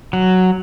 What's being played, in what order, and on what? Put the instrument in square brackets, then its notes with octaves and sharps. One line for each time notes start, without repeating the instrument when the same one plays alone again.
[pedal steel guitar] F#3